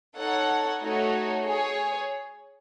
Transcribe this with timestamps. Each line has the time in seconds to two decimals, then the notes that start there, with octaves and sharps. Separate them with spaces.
0.17 D#4 A4 C#5 F#5
0.80 A3 D#4 F#4 C#5
1.44 G#4 C#5